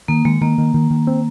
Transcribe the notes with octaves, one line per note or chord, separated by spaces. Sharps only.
D#3 A#3
D#3 G#3
D#3 A#3
D#3
D#3
D#3
C4